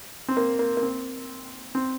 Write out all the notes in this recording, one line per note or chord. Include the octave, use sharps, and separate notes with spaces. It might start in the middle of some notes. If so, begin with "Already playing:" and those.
C4
A#3
A#3
A#3
C4
C4